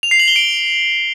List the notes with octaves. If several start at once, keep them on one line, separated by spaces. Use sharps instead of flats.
F7
C7
F#7
G7
D7